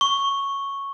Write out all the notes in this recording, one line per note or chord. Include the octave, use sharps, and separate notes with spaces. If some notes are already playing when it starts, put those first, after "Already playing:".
C#6